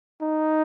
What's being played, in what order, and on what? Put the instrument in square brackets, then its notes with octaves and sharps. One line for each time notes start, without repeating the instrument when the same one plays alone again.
[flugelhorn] D#4